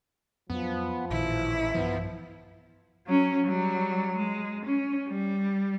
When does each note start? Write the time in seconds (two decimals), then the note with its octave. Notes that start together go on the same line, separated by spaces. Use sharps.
0.50 F2 F3 F#3 B3 D4
1.10 A1 A#2 D#3 E4
1.74 B1 G2 E3 F3 B3
3.07 F#3 C#4
3.46 F#3 G3
4.16 G#3
4.65 C#4
5.08 G3